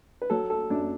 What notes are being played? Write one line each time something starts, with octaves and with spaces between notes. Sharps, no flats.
B4
F#3 A4
A4
F#2 D4